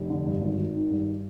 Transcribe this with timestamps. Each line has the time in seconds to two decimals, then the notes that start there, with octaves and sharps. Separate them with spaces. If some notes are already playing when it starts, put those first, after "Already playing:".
Already playing: F1
0.10 D3
0.26 G2
0.42 G#1
0.58 G#1
0.74 D#3
0.90 G2